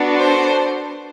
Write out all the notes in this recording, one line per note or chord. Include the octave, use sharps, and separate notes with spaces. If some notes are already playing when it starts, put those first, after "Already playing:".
Already playing: B3 D4 F#4 A4
C5